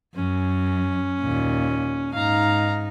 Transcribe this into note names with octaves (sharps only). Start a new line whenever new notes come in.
F#2 C#4
D#2 A#2
G#2 D#4 F5 A#5